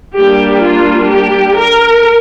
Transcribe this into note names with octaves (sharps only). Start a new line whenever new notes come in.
G3 A#3 D4 G4
F4
G4
A#4